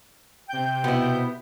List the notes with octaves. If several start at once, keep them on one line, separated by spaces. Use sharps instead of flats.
C3 G5 G6
B2 B3 E4